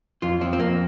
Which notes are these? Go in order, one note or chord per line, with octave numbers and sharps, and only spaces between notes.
F2 F4
F3 C4
C4
F2 A#3